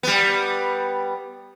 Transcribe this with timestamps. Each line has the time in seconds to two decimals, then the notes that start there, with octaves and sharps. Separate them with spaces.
0.03 G3 B3